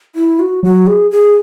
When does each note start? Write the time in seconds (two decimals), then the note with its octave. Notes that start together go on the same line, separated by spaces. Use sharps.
0.16 E4
0.39 F#4
0.63 F#3 F#4
0.87 G#4
1.11 G#4